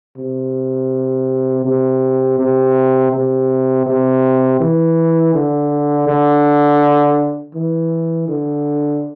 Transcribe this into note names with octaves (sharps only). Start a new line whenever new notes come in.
C3
C3
C3
C3
C3
E3
D3
D3
E3
D3